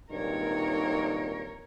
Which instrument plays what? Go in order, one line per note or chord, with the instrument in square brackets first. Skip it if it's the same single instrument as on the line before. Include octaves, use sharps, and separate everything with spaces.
[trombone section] G#1 G2 A#2 [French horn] D#4 [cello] A#4 C#5